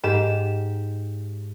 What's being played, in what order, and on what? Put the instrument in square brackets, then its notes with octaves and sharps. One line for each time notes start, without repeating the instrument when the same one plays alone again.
[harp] G#2 G4 E7